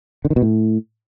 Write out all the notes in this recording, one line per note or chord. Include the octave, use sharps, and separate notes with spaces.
D3
D#3
B2
A2